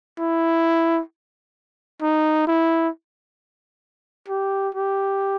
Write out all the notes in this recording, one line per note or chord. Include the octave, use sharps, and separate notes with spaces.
E4
D#4
E4
G4
G4